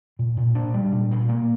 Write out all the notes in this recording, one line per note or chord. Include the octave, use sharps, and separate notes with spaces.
A#2
A#2
D4
G3
A#2
A#2
A#3